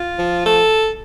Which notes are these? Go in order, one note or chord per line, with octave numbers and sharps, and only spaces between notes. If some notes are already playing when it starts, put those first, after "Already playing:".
Already playing: F4
F3
A4